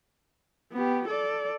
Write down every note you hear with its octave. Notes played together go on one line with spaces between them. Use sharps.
B3 G4
A4 D5